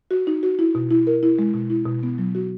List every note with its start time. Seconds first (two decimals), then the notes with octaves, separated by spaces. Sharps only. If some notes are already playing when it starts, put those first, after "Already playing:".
0.11 F#4
0.27 D#4
0.43 F#4
0.59 E4
0.75 B2
0.91 E4
1.07 A#4
1.23 E4
1.39 G#3
1.54 B2
1.70 E4
1.86 B2
2.03 B3
2.18 F#3
2.35 F#4